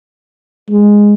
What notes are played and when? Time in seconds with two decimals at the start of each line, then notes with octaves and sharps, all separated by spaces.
0.70 G#3